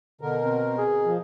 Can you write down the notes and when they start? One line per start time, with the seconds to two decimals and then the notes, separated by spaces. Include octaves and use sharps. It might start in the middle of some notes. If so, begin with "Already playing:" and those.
0.21 B2 D3 A#4
0.43 C4
0.78 G#4
1.05 F3